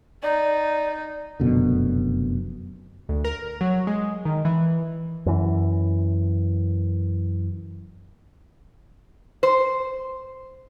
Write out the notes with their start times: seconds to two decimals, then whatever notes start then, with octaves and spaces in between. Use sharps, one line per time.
0.23 D#4 D5
1.40 F1 F#2 B2 D3
3.09 D2
3.25 A#4
3.61 F#3
3.87 G#3
4.25 D#3
4.45 E3
5.26 F#2 E3
9.43 C5